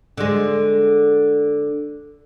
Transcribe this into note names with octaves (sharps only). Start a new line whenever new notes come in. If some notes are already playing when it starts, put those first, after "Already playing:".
D3 G#3